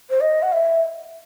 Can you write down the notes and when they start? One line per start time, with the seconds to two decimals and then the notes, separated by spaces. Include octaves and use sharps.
0.10 C5
0.21 D#5
0.42 F#5
0.52 E5